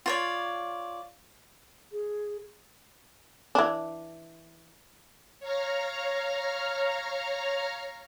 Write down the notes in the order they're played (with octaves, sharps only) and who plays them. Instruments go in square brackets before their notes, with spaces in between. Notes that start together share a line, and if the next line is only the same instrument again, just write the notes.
[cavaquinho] F4 C#5 D5
[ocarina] G#4
[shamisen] E3 D4
[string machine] C#5 F5 A#5 F6